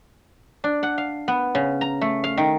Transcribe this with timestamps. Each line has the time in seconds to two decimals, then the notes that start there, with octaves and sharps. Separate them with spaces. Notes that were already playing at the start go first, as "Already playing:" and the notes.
0.64 D4
0.83 F#5
0.98 F5
1.28 B3
1.55 C#3
1.81 A#5
2.01 A3
2.24 F5
2.38 D#3